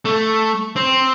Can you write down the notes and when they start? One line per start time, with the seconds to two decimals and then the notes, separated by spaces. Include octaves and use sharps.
0.05 A3
0.76 C4